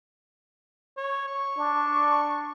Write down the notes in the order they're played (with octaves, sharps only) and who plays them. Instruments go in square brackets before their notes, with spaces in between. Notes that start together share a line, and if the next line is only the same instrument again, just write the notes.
[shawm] C#5
C#6
[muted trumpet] D4